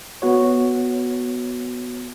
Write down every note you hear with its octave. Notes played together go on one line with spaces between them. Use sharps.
B3 F#4 C#5